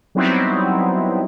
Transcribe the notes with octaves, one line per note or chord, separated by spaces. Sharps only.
F#3 G3 B3 C4 D#4 E4